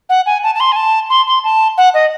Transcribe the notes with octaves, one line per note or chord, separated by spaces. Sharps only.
F#5
G#5
A5
A5
C6
G#5
A5
C6
C6
A5
F#5
D#5